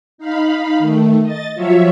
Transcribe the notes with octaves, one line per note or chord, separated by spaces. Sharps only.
D#4 F5 B5
D#3 A3
D#5 A6
F3 F#3 F4 C#5 E5